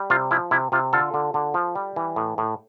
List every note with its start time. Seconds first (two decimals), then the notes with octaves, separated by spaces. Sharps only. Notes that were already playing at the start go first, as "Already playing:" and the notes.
Already playing: G3
0.10 C3 F4
0.31 F3 E4
0.51 C3 E4
0.72 C3 F4
0.93 D3 F4 A4
1.14 D3
1.34 D3
1.54 F3
1.75 G3
1.96 E3
2.16 A2
2.38 A2